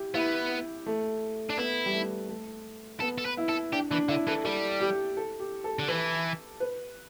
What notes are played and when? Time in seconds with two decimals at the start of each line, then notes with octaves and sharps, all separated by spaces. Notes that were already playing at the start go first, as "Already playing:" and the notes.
Already playing: E4 G4
0.14 B3 E4
0.86 A3
1.50 D4
1.58 B3 E4
1.86 G3
1.93 A3
2.29 A3
3.00 B3 A4
3.18 A4
3.25 B4
3.37 E4
3.49 A4
3.72 D4 G4
3.91 E3 D4
4.08 D3 E4
4.27 E3 A4
4.44 G3 A4
4.81 G4
5.17 A4
5.40 G4
5.64 A4
5.79 D3
5.88 E3 B4
6.60 B4